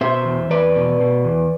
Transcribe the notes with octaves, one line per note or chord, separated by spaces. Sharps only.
B2 C5 E5
E2
E2 B4 D5
B2
B2
E2